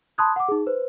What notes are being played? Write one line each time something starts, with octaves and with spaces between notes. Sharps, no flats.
A5 B5 C6 D#6 F#6 G#6
F#5 D6
D#4 G#4
B4 C5